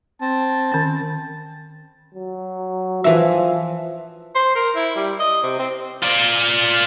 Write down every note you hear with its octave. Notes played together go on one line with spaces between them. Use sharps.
C4 A5
D#3 C#4
F#3
E3 F3 E5
C5
A#4
E4
G3
D#5
C3
C4
F4 D5